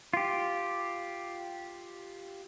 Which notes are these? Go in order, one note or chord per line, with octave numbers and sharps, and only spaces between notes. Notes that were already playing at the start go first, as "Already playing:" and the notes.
F4 G4